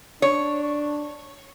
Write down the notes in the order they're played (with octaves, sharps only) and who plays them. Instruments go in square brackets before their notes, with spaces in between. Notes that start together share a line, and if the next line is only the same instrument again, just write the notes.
[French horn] D4 [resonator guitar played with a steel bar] C#5